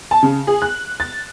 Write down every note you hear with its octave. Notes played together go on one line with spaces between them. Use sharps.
A5
C#3
G#4
F#6
A6